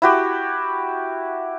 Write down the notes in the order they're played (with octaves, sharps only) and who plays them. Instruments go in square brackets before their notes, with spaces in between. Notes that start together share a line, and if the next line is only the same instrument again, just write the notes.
[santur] E4 F#4 G4